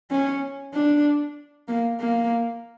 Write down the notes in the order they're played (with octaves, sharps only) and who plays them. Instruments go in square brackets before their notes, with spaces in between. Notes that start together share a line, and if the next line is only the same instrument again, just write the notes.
[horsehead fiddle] C#4
D4
A#3
A#3